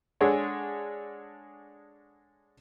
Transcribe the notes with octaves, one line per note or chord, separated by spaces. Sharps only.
G#3 D4 G#4 A4 C#5 F#5